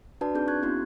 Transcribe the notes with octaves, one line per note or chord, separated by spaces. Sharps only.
D4 F#4 B4 D5 A5
C4 D4 D#4 G#4 G6
G#4 C#6 F#6 G#6
B3 C#4 E4 F#4